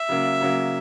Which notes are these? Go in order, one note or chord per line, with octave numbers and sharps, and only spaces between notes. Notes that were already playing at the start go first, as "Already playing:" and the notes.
Already playing: E5
C#3 F#3 A#3
C#3 F#3 A#3